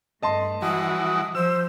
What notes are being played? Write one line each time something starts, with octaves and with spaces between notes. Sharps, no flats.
G2 A3 D#5 A5 C6
E3 F3 G3 F#4 D#6
F3 C5 E6